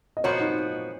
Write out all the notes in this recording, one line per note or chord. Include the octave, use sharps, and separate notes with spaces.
D#5
A#2 F3 B3 F#4 C#5
D#4